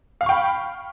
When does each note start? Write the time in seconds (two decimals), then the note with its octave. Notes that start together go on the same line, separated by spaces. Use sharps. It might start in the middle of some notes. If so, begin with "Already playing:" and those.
0.21 F5
0.23 F6
0.26 C#6
0.29 G5
0.32 B5